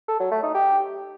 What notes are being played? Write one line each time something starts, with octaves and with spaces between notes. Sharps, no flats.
A4
F#3
A3
D#4
G4